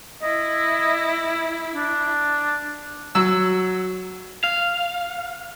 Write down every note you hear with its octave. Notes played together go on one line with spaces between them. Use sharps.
E4 D#5
D4
F#3 E6
F5